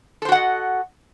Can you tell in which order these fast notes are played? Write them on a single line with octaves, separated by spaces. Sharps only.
A4 C5 F#4 F#5 D#5